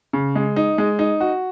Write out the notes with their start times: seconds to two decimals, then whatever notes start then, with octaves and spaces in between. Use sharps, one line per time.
0.13 C#3
0.35 G#3
0.56 D#4
0.78 G#3
0.99 D#4
1.21 F#4